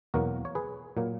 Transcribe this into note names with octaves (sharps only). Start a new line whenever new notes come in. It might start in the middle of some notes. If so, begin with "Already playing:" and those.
E2 B2 F#3 A#3 F#4 A#4
C#5
G#4 B4
A#2 F#3 A#3